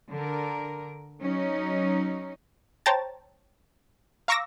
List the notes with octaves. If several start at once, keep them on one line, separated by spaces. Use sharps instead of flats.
D3 A#4
F#3 C#4 D#4
C5 C#5 G5 A5 A#5 A6
F5 A#5 C#6 D6 E6 A#6